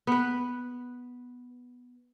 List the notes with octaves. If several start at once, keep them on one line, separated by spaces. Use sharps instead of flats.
B3 B4